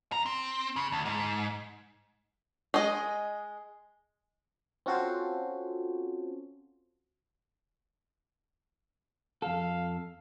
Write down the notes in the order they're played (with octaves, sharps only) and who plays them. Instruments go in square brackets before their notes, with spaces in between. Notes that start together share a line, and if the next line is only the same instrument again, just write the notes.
[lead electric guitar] F2 A#5
C4
C#3
D2
G#2
[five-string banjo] G#3 D#5
[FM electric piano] C4 C#4 F4 F#4 A4 C5
[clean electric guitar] F2 A4 [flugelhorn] F5